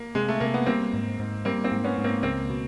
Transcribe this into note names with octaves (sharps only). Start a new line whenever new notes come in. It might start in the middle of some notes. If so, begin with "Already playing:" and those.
Already playing: A#3
C3 G#3
A3
C3 A#3
B3
G3 A#3 C4
G#2
G#2
G3 A#3 C4
A#3 C4
G#2
B3 C#4
G#2
A#3 C4
C#2 A#3 C4
B2